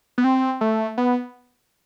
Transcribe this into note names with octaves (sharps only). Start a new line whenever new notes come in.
B3
C4
A3
B3